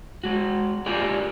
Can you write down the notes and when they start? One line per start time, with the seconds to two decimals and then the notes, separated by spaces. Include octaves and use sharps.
0.24 G#3 F#4
0.86 F4 G4 G#4 A#4 D5